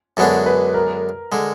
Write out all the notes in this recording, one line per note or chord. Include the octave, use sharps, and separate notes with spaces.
F#2 D3 G#3 B3 D4 F#4
B4
A#4
D3 G#3